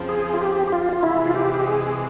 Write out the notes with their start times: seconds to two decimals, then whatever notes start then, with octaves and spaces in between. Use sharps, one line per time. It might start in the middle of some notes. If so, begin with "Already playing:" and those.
Already playing: F2 C#3 F3 C4
0.09 G#4
0.34 F4
0.41 G4
0.67 G4
0.72 F4
0.93 F4
1.03 C3 E3 G#3 E4
1.26 F4
1.35 G4
1.54 G4
1.66 G#4